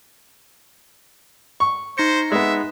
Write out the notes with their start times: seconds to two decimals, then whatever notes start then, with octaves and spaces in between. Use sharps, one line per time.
1.60 C#6
1.98 D#4 C5 A#6 C#7
2.32 G#3 B3 E5